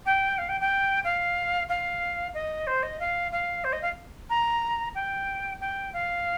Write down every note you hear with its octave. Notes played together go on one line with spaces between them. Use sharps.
G5
F5
G5
G5
F5
F5
D#5
C5
D#5
F5
F5
C5
D#5
F5
A#5
G5
G5
F5